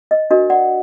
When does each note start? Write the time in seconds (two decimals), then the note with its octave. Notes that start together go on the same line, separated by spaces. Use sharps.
0.11 D#5
0.30 D4 F#4 A#4 D#5
0.50 D5 F#5